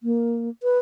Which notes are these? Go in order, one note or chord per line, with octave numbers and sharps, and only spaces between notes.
A#3
B4